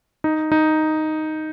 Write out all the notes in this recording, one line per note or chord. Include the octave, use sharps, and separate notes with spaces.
D#4
D#4